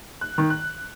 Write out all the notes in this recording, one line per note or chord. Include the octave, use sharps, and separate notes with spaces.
F#6
D#3
F#6